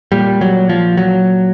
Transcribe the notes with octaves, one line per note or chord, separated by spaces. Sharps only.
A#2 G3
F#3
F3
F#3